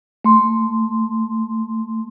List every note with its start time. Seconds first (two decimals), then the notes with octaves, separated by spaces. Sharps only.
0.25 A3 C6